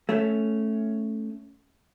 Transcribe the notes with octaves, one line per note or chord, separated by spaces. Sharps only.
A3 C#4